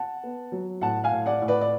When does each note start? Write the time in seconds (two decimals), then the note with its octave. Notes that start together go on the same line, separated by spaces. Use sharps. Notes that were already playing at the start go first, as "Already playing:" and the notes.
Already playing: F#5 A5
0.24 B3
0.52 F#3
0.81 A2 F#5 A5
1.04 F5 G#5
1.12 A2
1.26 D5 F#5
1.42 A2
1.48 B4 D5
1.61 D5